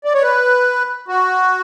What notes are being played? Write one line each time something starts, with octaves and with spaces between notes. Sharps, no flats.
D5
C#5
B4
F#4